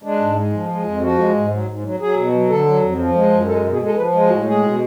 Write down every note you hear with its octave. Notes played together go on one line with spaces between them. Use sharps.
G#3 D4
G#2
G#3
F3
G#3
F2
F3 F#4
G#3
G#2
F#3
G#2
F#3
F#3 G#4
B2
F#3
D3 A4
F#3
F2
F3
G#3
F#2
G#3 A4
B2
G#4
G#3 A4
F3 B4
G#3
A2 F#4
G#3 G#4
B2